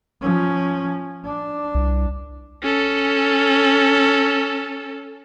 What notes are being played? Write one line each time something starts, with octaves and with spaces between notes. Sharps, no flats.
F3 C#4
D4
C2
C#4 A4